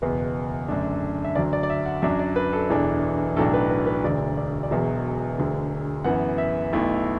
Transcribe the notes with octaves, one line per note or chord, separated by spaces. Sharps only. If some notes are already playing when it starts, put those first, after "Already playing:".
F#1 E2 B2 B4
F#2 D3 A3 D4
E5
D2 D3 F#3 D5
D5
D5
E5
F#5
F#2 F#3 D4 E5
D5
B4
A4
E1 E2 E3 D4
B1 A2 F#3 D4 A4
B4
B4
B4
E1 D2 D3 D5
D5
D5
E1 E2 B2 F#3 E5
E1 D2 D3
F#2 E3 B3 F#5
E5
B1 B2 A3 E4